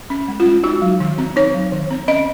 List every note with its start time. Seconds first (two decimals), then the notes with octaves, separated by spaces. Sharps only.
0.10 C#4
0.28 G#3
0.40 F4
0.46 G#3
0.63 D#4 F#4
0.82 F#3
1.00 D#3
1.18 C4
1.36 D#4 C#5
1.54 F#3
1.72 D#3
1.91 C4
2.08 C#4 D#5